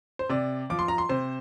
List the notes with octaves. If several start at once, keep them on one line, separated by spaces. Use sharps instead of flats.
C5
C3 D5
F3 D6
C6
A#5
C6
C3 C5